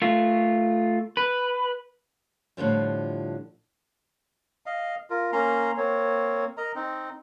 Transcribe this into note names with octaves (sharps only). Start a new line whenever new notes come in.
A3 F4
B4
A2 D3 F3 G3
D#5 F5
F4 A#4
A#3 C#4 A#5 C6
A#3 C4 C#5
A#4 D#5 A#5
C4 D#4